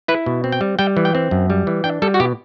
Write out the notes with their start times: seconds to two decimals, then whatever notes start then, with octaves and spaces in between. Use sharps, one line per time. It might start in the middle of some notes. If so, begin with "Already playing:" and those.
0.08 E4 B4
0.26 B2
0.44 C4
0.52 G5
0.61 G3
0.79 G3 G5
0.97 E3
1.05 G5
1.15 C4
1.31 F#2
1.50 G3
1.67 E3
1.84 D4 G5
2.02 G3 A4
2.14 F#4
2.20 B2 G4